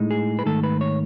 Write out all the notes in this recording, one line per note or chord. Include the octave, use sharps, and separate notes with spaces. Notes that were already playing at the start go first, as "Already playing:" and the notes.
Already playing: A2 G#3 D#4
G#4
B4
G#2 D#3 A3 A4
B4
C#5